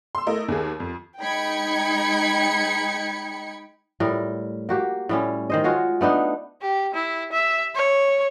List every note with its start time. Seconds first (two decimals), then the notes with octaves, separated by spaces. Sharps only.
0.15 C6 E6
0.27 A3 E4 A#4 D#5
0.48 D#2 A#3 G#4
0.80 F2
1.20 G#3 D#4 G5 B5 G#6 C#7
4.00 A2 G3 A#4
4.69 A#3 F#4 G4
5.09 A2 G3 C#4
5.50 D#3 C5 D#5
5.64 G#3 F4 F#4 C#5
6.01 A3 B3 D4 D#4
6.62 G4
6.94 E4
7.33 E5
7.75 C#5